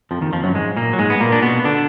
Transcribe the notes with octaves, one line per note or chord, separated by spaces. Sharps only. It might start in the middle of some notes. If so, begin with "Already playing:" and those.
F2 F3
D#2 D#3
F2 F3
F#2 F#3
G#2 G#3
A#2 A#3
F#3
G#2 G#3
B3
A#2 A#3
D4
B2 B3
D3 D4